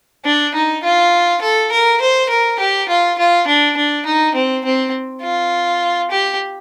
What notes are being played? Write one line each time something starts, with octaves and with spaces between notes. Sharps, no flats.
D4
D#4
F4
A4
A#4
C5
A#4
G4
F4
F4
D4
D4
D#4
C4
C4
F4
G4